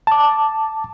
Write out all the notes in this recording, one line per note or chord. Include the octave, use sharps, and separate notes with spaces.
A5 D6